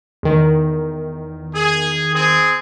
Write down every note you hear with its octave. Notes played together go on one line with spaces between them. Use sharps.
E2 D#3
G#4
C4 G#4